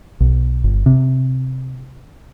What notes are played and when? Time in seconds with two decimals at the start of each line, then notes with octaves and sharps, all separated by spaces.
0.20 B1
0.64 G1
0.86 C3